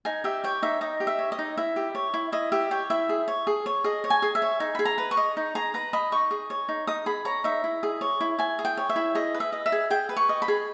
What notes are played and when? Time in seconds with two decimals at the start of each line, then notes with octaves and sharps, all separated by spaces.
0.05 D#4 G#5
0.24 G4 E5
0.44 C#5 G5
0.62 D#4 E5
0.81 D#4 D#5
1.00 G4
1.07 E5
1.19 C#5
1.32 D#5
1.39 D#4
1.58 E4 E5
1.76 G4
1.95 C#5
2.14 E4
2.32 E4 D#5
2.52 G4 E5
2.71 C#5 G5
2.90 E4 E5
3.09 G#4
3.28 C#5
3.47 G#4
3.66 C#5
3.84 G#4 D#5
4.04 C#5
4.10 G#5
4.22 G#4
4.35 E5
4.42 C#5
4.60 D#4 G#5
4.75 G#4 B5
4.85 A#5
4.98 B4
5.11 C#6
5.17 D#5
5.37 D#4
5.55 G#4 A#5
5.74 B4 A#5
5.93 D#5 B5
6.12 D#4 C#6
6.31 G#4
6.50 C#5
6.69 D#4
6.87 D#4 D#6
7.06 G#4 B5
7.25 C#5 A#5
7.44 D#4 E5
7.64 E4
7.83 G#4
8.01 C#5
8.21 E4
8.39 E4 G#5
8.59 G#4
8.65 G5
8.77 C#5
8.90 E5
8.96 E4
9.15 G#4 D#5
9.34 B4
9.40 E5
9.53 D#5
9.66 E5
9.72 G#4
9.90 G#4 G5
10.09 B4
10.17 C#6
10.29 D#5
10.42 B5
10.48 G#4